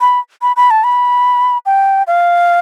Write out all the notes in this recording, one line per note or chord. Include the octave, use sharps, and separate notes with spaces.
B5
B5
B5
A5
B5
G5
F5